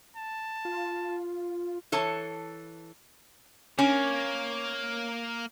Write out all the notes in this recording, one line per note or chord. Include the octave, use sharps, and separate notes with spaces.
A5
F4
E3 A4 C#5 A5
A#3 C#4